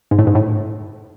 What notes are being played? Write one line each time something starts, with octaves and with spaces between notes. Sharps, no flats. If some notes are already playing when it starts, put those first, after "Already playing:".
G#2
A2
G#2
A2